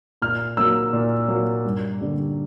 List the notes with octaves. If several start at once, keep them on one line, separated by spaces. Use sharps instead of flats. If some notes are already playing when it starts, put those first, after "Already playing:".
A#2 F6
F#3 A#3 E6
A#2
F#3 A#3
G2
D3 G3 A#3